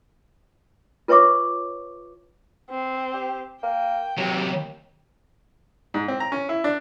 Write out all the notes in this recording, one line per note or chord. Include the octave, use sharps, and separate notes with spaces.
F4 B4 C#5 E5 C#6 D6
C4
G4
A#3 G5
D#2 C3 F#3
G#2
C4
A#5
C#4
E4
D4